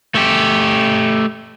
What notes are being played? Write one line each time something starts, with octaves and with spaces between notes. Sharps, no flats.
A3 G4